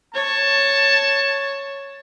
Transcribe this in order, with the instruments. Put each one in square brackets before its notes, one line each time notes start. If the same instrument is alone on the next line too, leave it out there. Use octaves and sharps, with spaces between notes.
[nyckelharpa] C#5 [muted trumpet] A5